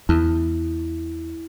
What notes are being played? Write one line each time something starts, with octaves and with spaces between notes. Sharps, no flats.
E2 E4